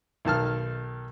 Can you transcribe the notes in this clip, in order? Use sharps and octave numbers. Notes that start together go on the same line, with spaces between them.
B1 D#3 A5 F6